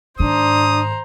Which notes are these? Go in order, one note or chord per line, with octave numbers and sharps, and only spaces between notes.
G#2 D#3 D4 C5 A#5 D#6